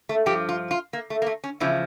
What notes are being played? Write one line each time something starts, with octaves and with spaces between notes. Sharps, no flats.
A3
G2 F3 G4
F4
F4
A#3
A3
A#3
A3
C#4
E2 C#3 F3 E4